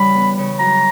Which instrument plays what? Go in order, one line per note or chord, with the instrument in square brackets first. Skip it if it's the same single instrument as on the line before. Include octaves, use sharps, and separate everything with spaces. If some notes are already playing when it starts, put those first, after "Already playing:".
Already playing: [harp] C#3 E3 G3 C#4 [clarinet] B5
[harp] B3
C#3
[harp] F#3 [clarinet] A#5